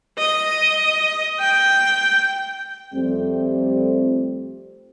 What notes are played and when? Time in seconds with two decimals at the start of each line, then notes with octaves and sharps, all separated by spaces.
0.18 D#5
1.40 G5
2.94 F2 G3 A3 C4